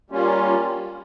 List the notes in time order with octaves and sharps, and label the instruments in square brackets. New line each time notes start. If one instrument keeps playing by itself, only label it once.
[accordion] G3 A#3 C#4 F4